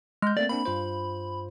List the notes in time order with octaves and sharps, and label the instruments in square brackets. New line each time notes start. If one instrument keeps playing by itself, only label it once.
[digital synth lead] G#3 [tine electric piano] F6 G6
[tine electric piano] A3 A#3 C4 [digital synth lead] D5
[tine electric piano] A#3 C4 D4 [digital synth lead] B5
[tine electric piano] G2 F4 C5